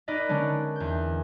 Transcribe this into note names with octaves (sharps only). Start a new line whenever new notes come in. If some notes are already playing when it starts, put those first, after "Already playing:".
D#4 A#4 B4 D5 D#5
D3 G#3 C#4 D4
E2 G6